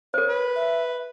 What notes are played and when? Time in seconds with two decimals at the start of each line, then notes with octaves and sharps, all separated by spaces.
0.14 A#4 C5 C#5
0.29 B4
0.56 E5